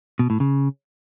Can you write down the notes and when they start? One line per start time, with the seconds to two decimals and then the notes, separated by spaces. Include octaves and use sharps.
0.19 B2
0.30 A2
0.40 C#3